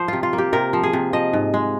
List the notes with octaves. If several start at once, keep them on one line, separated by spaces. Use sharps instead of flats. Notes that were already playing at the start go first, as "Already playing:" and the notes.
Already playing: F3 C5
C3 F4
F4
A#3
G4
C3 A#4
F3
G#4
C3
F3 D#5
G#2
G#3